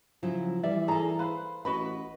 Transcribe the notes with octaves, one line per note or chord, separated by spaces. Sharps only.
C#3 F3 F#3 E4
E3 G3 D5 E5
D#4 G#4 A4 D5 A#5
B4 C5 F5 B5
A1 F#4 B4 D#5 B5